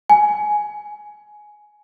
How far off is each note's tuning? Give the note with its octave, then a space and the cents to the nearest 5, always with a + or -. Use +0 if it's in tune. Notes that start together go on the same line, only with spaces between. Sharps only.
G#5 +10